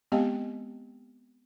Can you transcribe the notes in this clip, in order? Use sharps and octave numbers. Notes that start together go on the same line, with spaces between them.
G#3 B3 C4 G4 D#5 G5